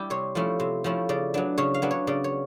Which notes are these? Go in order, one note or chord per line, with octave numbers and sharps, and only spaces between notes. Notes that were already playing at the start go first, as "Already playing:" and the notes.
Already playing: G3 E4 G4
C3 C#5
F3 A3 C#4 E4
C3
F3 A3 C#4 E4
C#3 D5
F#3 B3 D4
C#3 C#5
F5
F#3 B3 D4
C#5
C#3 D5
C#5